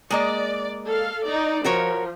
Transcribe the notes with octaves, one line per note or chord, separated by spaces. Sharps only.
G#3 A#3 D5 D#5
A4 F5
D#4 D5
F3 F#4 A#4 C#5